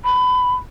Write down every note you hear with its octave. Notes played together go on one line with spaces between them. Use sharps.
B5